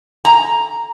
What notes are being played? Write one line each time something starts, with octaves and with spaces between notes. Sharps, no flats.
A#5